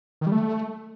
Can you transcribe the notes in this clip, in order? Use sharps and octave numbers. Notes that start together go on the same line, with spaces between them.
D#3
G3
A3